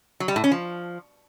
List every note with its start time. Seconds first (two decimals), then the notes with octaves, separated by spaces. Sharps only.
0.20 F#3
0.28 G3
0.36 A2
0.44 C#4
0.51 F3